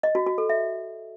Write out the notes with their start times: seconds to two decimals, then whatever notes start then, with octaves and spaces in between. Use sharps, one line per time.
0.03 D#5
0.15 F#4
0.26 F#4
0.38 A4
0.49 E5